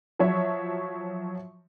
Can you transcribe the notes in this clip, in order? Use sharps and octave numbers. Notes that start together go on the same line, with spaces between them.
F3 F#3 C#5 E5